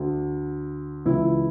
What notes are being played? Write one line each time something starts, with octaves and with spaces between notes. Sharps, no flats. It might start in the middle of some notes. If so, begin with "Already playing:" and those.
Already playing: D2 D3
C#2 C#3 E3 E4